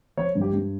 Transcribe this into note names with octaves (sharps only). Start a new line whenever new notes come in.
F3 C#5
G2
G4
G2